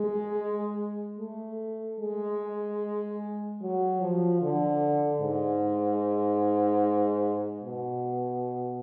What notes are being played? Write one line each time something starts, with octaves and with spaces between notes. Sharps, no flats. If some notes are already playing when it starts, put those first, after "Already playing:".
Already playing: G#3
A3
G#3
F#3
F3
D3
G#2
B2